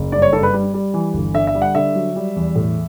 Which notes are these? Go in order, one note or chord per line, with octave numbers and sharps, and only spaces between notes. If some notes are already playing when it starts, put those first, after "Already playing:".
Already playing: F#1
G2 D5
C#5
G2 A4
B4
G3
G3
E3
G1
D3 E5
E5
G3
F#5
D3 E5
F#3
G3
E2
A2